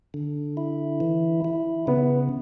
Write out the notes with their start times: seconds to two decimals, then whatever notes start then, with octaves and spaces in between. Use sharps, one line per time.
0.14 D3
0.57 E4
1.00 E3
1.44 E4
1.87 C#3 B3